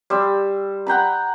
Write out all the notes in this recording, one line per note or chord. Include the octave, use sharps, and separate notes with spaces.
G3 C6 E6
F#5 G5 A#5 B5